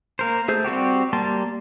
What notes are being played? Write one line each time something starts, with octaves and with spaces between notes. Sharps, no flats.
A#3 A#4 C5
A3 G#4 C5 G6
G3 C4 F#4 G4
G3 A#3 A5 C6